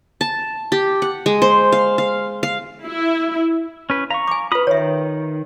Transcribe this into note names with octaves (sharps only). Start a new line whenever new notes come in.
A5
G4
F#5
G#3
C5
F5
F5
F5
E4
C#4 B4
F5 A#5 C#6
G#5 D6
F4 B4 B5 D#6
D#3 C#5 E5